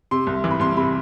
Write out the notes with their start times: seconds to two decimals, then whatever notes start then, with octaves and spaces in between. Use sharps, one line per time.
0.11 C3 C6
0.27 C2
0.44 E3
0.51 B5
0.60 C2 C6
0.77 C3 B5